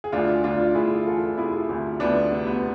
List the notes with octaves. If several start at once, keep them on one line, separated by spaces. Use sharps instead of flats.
G#4
D2 D4 F4
D2 D4 F4
D2 E4 G#4
E3 F4 A4
C3 E4 G#4
D2
D2 B3 D4
C3
B3